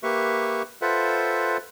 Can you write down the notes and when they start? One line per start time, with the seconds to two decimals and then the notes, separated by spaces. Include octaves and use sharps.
0.03 A#3 G4 B4 E5 C#6
0.82 F4 A4 B4 C5 E5 F#5